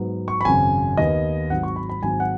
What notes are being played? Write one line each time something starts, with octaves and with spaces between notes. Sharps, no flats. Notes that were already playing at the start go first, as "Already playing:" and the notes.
Already playing: G#2 F#3 B3
C#6
B5
G#1 F#2 C#3 G#5
D#2 D#3 B3 D#5
G#1 G#2 F#3 F#5
C#6
B5
B5
G#1 G#2 F#3 G#5
F#5